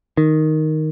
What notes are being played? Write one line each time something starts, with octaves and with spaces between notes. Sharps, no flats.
D#3